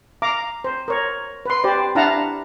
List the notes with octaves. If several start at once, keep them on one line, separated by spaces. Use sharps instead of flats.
F5 A#5 D6
C5
A#4 C#5
B4 C6
G4 B4 C5 D5
D4 E4 F5 F#5 A5 A#5